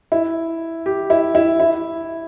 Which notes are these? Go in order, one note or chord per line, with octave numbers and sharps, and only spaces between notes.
E4
G4
E4
E4
E4